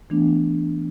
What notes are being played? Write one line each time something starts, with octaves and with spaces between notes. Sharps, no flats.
E3 A3 B3 D4